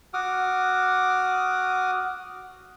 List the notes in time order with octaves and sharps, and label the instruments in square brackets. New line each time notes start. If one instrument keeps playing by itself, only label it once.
[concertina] F#4 F#5 D6 D#6 F6